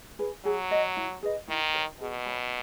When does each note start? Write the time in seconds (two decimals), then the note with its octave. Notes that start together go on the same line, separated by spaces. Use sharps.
0.19 G#4 B4
0.45 F#3 G#4
0.71 D#5 F#5
0.97 E4
1.23 G#4 B4 D#5
1.48 D#3 E4
1.74 A#4 C#5
2.01 B2 G#4
2.26 C#5 G#5 B5